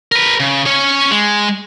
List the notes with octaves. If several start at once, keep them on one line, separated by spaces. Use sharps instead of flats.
A#4 B4
C#3
C#4 C#5
G#3